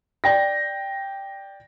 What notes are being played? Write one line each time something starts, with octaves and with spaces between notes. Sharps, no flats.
D5 G5 A#6